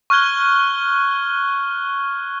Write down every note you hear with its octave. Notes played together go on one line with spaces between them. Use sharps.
C#6 F6 F#6 G#6 G7